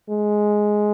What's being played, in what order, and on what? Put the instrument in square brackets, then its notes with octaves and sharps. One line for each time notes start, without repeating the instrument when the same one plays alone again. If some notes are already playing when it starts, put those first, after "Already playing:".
[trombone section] G#3